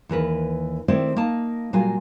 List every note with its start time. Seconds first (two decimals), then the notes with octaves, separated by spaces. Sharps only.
0.09 D#2 E3 A#4 B4
0.88 D#3 A3 C4 E4 C5 D5
1.16 A#3 D#4 A5
1.73 A#2 F#3 G3 F4 A#4 G#5